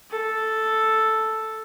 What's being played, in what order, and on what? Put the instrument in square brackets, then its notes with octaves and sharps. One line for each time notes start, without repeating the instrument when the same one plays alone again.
[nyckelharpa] A4